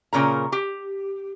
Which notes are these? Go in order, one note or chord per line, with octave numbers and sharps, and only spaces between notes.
A#2 C#3 A#4 A#5
G4